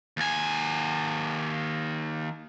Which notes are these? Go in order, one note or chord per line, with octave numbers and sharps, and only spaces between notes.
D#2 G#5